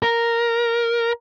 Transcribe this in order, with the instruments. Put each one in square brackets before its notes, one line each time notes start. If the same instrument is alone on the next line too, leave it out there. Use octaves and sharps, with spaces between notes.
[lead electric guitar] A#4